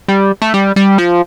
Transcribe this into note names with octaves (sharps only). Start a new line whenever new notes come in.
G3
A3
G3
G3
F3